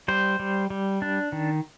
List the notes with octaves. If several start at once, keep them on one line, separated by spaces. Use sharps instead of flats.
G3 C5
G3
G3
D4
D#3